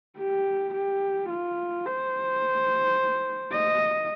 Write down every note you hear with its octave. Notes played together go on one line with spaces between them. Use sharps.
G4
G4
F4
C5
D#5